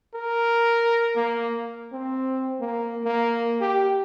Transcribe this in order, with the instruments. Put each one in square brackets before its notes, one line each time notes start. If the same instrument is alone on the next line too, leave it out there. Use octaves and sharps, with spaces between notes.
[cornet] A#4
A#3
[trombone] C4
A#3
A#3
G4